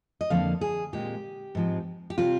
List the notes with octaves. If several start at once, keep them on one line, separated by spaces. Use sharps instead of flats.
D#5
F2 D3 F3 A#3 F5
G#4
A#2 G#3 C4 G4
G#2 F3 G#3 C4
G4
C3 G3 C4 F4